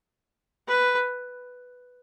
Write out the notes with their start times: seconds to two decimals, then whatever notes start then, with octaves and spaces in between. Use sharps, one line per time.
0.68 B4